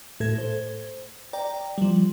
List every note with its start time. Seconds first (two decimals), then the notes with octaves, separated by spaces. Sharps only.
0.20 A2 A4 G#6
0.38 C5
1.33 D5 G5 A#5
1.78 F3 G3